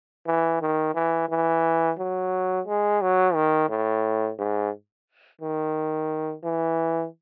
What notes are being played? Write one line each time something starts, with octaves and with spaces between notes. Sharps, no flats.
E3
D#3
E3
E3
F#3
G#3
F#3
D#3
A2
G#2
D#3
E3